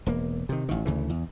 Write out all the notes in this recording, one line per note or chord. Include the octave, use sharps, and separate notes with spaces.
E1 A#3
C3 D#3
A1 D#3
D2 C#3 E3
E2